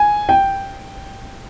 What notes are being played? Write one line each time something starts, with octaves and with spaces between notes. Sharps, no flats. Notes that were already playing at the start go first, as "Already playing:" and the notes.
Already playing: G#5
G5